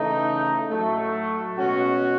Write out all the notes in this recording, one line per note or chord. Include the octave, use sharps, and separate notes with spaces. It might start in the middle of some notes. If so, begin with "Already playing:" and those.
Already playing: C#3 E3 A3 D#4
A2 F#3 A3
B2 G#3 C#4 F#4